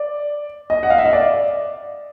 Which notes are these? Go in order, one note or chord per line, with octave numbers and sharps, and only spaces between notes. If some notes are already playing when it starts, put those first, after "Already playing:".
Already playing: D5
D#5
F#5
F5
E5
D#5
D5